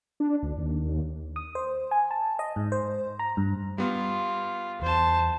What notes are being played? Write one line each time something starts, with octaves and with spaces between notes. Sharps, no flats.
D4
D2
D#2
D#6
C5
G#5
A5
D#5
G#2
C5
A#5
G2
G3 B3 F4
E2 C5 A5